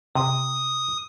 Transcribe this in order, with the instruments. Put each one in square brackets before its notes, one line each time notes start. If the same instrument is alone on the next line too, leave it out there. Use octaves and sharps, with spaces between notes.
[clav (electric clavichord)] C3 [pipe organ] D#6